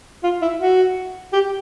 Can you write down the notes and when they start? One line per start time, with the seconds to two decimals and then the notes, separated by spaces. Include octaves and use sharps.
0.23 F4
0.42 E4
0.60 F#4
1.33 G4